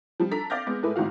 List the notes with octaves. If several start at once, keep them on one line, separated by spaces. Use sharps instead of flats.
F3 G3
D4 A4 A#5 B6
D5 F5 D6 F6 G6 A#6
G#3 B3
A2 G#3 A3 E4 B4
G1 G#2 E3 F#4 F5